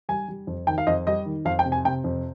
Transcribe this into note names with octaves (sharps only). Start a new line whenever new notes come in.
G3 G#5
G3
F2
D#3 G5
F5
F2 D#5
G3 D#5
D#3
F2 F5
G5
C3
G#5
C3 G5
F2